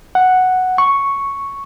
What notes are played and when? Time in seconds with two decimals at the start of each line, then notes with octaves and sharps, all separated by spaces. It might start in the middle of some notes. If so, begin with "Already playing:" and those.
0.15 F#5
0.78 C#6